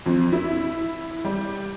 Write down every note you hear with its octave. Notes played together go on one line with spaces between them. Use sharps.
F2
E4
G3